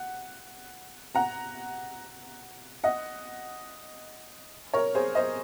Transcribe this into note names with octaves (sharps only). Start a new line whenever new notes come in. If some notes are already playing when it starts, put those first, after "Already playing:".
Already playing: F#5
F#5 A#5
D#5 F#5
A#4 C#5
G#4 C5
C5 D#5